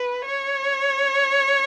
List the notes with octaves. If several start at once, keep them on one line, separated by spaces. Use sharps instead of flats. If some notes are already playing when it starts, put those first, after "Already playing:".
Already playing: B4
C#5